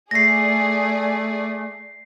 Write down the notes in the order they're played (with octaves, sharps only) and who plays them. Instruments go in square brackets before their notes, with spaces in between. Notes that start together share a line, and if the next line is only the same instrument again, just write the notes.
[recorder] A3 [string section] G#4 D5 [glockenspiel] A#6 C7